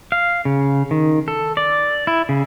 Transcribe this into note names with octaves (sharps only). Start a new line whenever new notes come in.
F5
C#3
D#3
A4
D5
E4
C#3